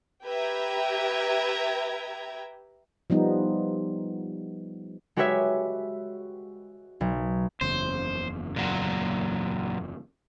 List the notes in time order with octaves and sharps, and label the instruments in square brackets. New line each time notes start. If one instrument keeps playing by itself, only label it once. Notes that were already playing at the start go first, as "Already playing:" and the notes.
[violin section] G4 B4 E5 G5 A#5 G#6
[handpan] F3 G3 B3 D#4
[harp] G#3 F#4 G4 B4 C#5 E5
B1
[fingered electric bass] F#1 E2 C#3 [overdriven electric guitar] C5
[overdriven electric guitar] A#2 F#3